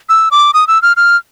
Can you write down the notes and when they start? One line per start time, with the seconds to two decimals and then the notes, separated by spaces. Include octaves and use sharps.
0.09 E6
0.31 D6
0.54 D#6
0.68 E6
0.82 F6
0.97 F6